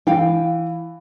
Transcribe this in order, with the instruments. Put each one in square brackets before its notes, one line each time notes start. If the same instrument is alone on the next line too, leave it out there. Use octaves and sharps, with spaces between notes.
[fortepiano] E3 [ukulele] F5 G5